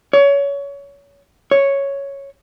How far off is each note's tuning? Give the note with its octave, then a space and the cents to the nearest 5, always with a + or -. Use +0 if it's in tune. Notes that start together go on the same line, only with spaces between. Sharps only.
C#5 +25
C#5 +0